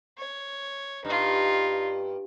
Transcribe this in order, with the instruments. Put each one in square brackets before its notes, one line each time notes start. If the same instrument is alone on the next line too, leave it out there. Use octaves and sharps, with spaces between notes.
[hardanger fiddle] C#5
[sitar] G2 [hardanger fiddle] D#4 F4